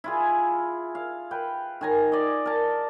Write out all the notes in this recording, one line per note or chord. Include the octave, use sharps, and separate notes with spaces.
E4 F4 G#4
F5
B4 G5
D#3 G#5 A#5
D5 D#5
A#4 A5